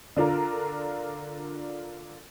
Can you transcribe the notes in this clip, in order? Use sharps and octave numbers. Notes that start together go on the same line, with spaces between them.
D3 D4 F4 A#4